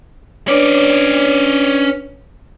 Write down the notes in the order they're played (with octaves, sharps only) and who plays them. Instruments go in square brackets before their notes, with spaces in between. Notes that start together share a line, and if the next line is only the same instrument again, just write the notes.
[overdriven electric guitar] C#4 D5 [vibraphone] D4 B4 C#5